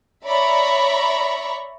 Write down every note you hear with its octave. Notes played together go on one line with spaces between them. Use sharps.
C#5 D5 E5 A#5 B5 C#6